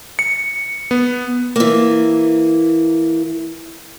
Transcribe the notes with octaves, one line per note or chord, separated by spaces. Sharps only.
C#7
B3
E3 A#3